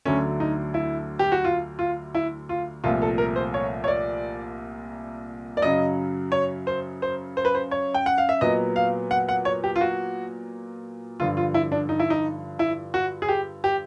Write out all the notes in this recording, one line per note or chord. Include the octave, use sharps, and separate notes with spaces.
D2 D3 F#3 A3 C#4
D#4
E4
G4
F#4
F4
F4
E4
F4
C2 A#2 F3 A3 F4
A4
A#4
C5
C#5
C#5
D5
D5
F#2 C#3 F#3 D#5
C#5
C5
C5
C5
B4
C5
C#5
G5
F#5
F5
E5
A#2 F#3 B3 D#5
F5
F#5
F#5
C#5
G4
F4
F#4
G2 D3 F3 F4
F4
E4
D4
D#4
E4
D#4
E4
F#4
G#4
G4
G4